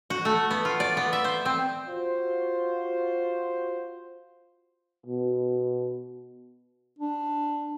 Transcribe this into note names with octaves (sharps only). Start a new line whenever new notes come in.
F#4
A3
B3
F4
D5
B3
E5
C5
C4
F4 F#4 C5
B2
D4